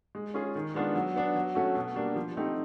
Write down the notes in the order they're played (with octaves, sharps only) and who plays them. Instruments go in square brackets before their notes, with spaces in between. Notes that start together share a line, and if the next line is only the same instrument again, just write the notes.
[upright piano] G#3
C#4 F4 G#4
D#3
G#3 B3 D4 F4
F#3
B3 D4
F#3
A3 C#4 F#4 A4
B2
G3 A#3 D4
F3
A3 C4 D#4 G4